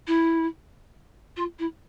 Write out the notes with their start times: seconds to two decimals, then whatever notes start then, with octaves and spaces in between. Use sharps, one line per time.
0.07 E4
1.36 F4
1.59 E4